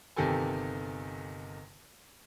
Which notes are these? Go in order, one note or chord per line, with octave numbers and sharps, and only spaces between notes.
G1 C3 D#3 G4 A4 G#5